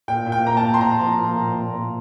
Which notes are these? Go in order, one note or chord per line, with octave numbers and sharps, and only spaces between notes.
A#2 G5
A#2
G5
A#3 A#5
A5
A#2
C6
A#2 A#5
F3
A#2
A#2
A#2
A#2